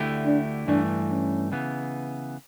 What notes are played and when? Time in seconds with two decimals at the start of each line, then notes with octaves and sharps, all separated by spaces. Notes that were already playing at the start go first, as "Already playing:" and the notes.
Already playing: D2 D3 A3 E4 G4
0.26 D4
0.67 G2 E3 A3 D4
1.10 C#4
1.52 C#3 E3 B3